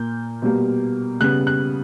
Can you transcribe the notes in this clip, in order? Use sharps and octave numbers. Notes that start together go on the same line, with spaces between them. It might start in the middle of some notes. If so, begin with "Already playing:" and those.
Already playing: A#2 A#3 G6
B2 G3 A#3
C#3 G3 B3 F#6
F#6